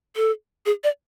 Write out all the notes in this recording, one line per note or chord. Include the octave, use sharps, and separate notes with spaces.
A4
G#4
D5